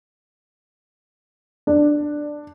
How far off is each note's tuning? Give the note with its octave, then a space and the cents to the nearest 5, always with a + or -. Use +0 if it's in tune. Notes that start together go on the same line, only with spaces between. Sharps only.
D4 +10